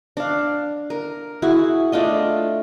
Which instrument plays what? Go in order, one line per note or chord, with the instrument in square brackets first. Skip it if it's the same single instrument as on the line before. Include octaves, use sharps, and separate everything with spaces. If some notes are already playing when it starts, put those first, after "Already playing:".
[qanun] D4 F5
A#4
E4 F#4 G#4
A3 D4 F4 D#5